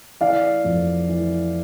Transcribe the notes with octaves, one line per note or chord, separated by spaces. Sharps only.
E3 D5 F5
F2
E3